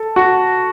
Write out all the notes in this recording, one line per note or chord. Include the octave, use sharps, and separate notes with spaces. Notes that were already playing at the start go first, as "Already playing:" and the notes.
Already playing: A4
F#4